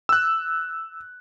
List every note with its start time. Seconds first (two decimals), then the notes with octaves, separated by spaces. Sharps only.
0.09 E6 F#6